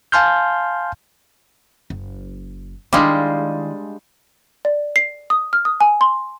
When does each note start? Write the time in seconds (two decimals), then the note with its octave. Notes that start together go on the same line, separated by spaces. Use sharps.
0.12 F5 G#5 A5 C6 F6 G6
1.90 F#1
2.93 D#3 G3 G#3 D4 E4 F5 C6
4.65 D5
4.96 C7
5.30 D#6
5.53 F6
5.65 D#6
5.81 G#5
6.01 C6